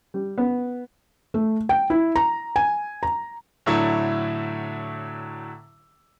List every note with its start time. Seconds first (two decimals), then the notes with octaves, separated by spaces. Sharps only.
0.14 G3
0.38 B3
1.34 A3
1.69 G5
1.90 E4
2.16 A#5
2.56 G#5
3.03 A#5
3.66 A2 D3 F#3 A3 D4 E4